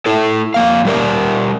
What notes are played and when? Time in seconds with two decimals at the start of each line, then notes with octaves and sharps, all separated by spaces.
0.06 A3 E4 A4
0.54 F2 A#3 F5
0.85 G3 G4 A#4 D5